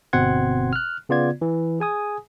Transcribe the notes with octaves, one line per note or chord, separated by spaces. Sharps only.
G1 B2 C4 F#5 C6 G#6
F6 F#6
C#3 B3 F4 D5 G#6
E3
G#4 G#5 D#6